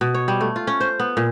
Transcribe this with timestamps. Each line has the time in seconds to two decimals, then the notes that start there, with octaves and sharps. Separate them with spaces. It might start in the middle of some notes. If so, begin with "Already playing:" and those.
0.01 B2
0.14 C#5
0.28 G3
0.41 A3
0.56 F4
0.67 C#4
0.81 C5
1.00 B3
1.17 A#2